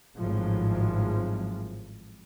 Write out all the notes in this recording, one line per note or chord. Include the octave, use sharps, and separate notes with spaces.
G#1 A2 F3 F#3 G#3